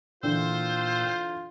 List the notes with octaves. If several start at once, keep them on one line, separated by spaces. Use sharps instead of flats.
A#2 D3 E3 F4 C5 G5 E6